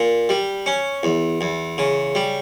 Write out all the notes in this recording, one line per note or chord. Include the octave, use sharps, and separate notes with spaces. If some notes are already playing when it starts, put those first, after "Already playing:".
Already playing: A#2
G3
C#4
E2
E2
C#3
G3